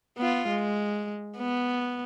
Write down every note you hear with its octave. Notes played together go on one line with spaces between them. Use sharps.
B3 F4
G#3
B3